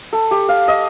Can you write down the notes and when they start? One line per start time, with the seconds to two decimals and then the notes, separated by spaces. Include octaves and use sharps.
0.13 A4
0.31 G4
0.49 F5
0.68 D#5